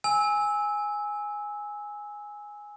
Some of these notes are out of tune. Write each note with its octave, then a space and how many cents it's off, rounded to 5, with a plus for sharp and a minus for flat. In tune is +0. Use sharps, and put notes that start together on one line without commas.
G#5 +0 E6 -20